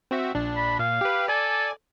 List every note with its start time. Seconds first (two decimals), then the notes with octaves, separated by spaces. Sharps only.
0.11 C4 F#4 E5
0.35 A#1 D4
0.56 B5
0.79 A#2 F5
1.01 G4 B4
1.28 A4 D5 G#5